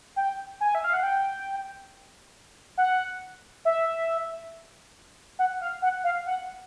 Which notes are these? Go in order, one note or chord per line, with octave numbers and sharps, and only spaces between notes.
G5
G#5
E5
F5
F#5
G5
F#5
E5
F#5
F5
F#5
F5
F#5